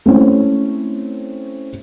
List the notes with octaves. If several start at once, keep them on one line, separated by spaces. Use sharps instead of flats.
A3 C4 C#4 E4